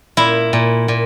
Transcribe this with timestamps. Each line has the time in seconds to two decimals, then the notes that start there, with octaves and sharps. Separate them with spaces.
0.17 A#2 E4
0.53 A#2
0.88 A#2